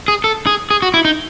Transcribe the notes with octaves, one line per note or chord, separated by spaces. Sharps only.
G#4
A4
G#4
G#4
F#4
E4
D#4